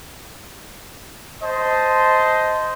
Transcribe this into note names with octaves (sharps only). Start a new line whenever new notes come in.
C5 D#5 A5